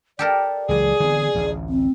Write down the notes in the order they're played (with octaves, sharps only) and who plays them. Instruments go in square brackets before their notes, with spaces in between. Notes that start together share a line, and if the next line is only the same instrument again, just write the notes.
[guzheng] G4 A4 A#4 [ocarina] D5
[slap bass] C#2 E3 F#3 [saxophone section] G#4
[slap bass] D3 E3 B3
A1 D2
[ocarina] C4